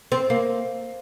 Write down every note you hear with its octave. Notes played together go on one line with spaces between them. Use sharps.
C4
A#3